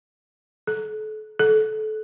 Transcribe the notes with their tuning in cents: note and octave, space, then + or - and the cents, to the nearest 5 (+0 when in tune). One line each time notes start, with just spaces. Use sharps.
A4 -35
A4 -25